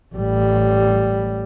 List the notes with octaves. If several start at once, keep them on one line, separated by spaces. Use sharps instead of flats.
A1 G3